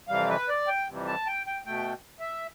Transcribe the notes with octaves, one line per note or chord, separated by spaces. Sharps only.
F2 C3 E3 G3 F5
B4
D5
G5
F2 C3 E3 G3
A5
G5
G5
B2 A3 G5
E5